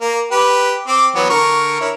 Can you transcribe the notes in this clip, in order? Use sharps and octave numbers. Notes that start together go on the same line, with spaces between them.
A#3 A#4
G4 B4
C4 D6
E3 F#3 B3
D3 A#4 C#6
E4 A#4 C#5